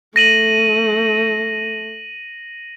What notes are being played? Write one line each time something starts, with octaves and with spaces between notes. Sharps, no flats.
A3 A#6 D#7 F#7